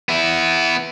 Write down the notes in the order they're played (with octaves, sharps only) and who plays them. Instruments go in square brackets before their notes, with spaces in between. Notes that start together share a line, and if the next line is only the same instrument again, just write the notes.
[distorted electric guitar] B3 E4